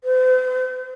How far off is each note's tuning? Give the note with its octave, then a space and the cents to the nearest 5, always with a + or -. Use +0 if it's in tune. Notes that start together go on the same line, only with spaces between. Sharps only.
C5 -45